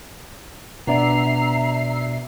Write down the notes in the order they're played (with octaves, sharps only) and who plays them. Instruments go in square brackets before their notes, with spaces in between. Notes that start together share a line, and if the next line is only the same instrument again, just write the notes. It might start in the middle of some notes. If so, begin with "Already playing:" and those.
[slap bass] B2 [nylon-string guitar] B3 D4 D5 [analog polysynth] E5 C7 [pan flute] A#5